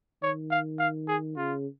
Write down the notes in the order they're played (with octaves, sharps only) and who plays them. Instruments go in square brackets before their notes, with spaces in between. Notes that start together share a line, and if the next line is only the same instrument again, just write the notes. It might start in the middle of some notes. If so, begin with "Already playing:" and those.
[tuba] D#3 [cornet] C#5
[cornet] F5
F5
G#4
[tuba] C#3 [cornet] F4